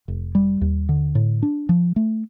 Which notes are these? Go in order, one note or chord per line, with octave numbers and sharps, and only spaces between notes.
F1
G3
D#2
D3
A2
D4
F3
A3